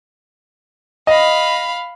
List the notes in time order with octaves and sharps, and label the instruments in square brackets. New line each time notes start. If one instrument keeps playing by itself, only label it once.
[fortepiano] D#5 [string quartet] F5 B5